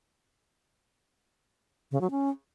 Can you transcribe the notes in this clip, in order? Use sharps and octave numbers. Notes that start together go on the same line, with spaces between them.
C#3
F#3
C#4